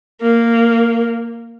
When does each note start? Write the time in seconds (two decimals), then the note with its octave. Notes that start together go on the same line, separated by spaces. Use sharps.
0.22 A#3